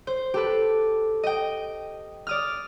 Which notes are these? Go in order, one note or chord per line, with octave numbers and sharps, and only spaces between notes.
C5
G4 A4 B4
D#5 G5
D5 D#6 F6